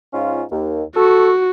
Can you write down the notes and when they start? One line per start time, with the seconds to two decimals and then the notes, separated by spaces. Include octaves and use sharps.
0.13 G#2 C#4 F4
0.51 D#2
0.96 F#4 A4 C#6